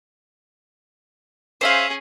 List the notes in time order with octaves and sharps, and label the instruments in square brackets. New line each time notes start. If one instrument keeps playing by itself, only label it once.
[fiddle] C#4 G#4 [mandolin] C5 E5 F5